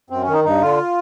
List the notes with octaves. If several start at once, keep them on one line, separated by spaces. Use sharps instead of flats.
F#2 C4
C#4
D#3
D#4
G2 D#4
D3 F4